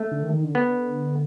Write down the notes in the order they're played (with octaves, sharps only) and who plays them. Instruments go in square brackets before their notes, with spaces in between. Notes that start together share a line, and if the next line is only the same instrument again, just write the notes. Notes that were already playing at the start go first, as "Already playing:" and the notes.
Already playing: [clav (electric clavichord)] A3
[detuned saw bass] D3
D#3
D#3
D3
[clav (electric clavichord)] B3